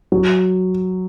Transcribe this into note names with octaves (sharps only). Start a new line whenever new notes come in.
F#3